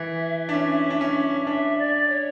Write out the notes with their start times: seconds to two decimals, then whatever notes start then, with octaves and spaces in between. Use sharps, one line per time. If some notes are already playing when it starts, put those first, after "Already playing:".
Already playing: E3 E5
0.49 D4
0.54 C#4
0.90 D4
1.01 C#4
1.47 D4 E5
1.78 D5
2.09 C#5